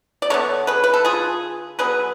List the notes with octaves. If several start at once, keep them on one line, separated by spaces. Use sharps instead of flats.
D5
D3 G#3 B3 A4 C#5
G#4 B4
B4
A4
F4 G#4
D3 F#3 B3 G#4 B4